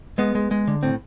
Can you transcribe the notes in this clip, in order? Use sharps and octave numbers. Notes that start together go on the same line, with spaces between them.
G#3 B3
G#3
G#3
D3
A2 C4